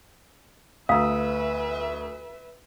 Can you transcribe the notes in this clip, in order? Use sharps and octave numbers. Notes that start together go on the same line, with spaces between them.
D2 B4 E5 F5 A#5 D#6 E6